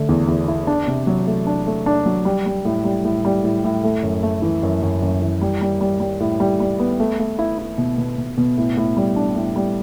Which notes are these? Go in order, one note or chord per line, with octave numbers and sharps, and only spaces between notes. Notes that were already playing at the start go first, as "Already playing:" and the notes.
Already playing: D3 A3
E2
E2
E4
D4
C3
F#3
A3
D4
A3
D4
F#3
G3
G3
A2
G3
A2
G3
A2
A2
A3
F#2
A3
E3
F#2
F#2
F#2
E3
G3
G3
G3
G3
A2
G3
G3
B3
A3
A3
E4
E4
B2
B2
B2
B2
A2
A2
G3
D4
A2
G3